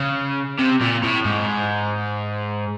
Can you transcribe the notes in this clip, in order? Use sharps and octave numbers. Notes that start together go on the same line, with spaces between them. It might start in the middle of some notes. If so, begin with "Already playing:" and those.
Already playing: C#3
C3
A#2
A2
G#2